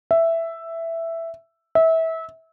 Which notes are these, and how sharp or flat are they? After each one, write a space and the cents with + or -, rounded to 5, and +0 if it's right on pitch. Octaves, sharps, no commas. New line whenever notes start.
E5 +5
E5 -25